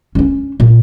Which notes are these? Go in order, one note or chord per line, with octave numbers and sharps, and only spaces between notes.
C#4 D4
A#2